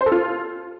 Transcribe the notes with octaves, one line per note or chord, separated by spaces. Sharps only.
C5
A4
F4